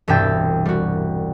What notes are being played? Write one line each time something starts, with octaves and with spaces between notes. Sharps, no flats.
E1 C2 G2 E5 G5 A6
G3 F#4